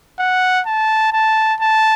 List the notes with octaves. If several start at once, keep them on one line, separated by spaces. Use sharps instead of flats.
F#5
A5
A5
A5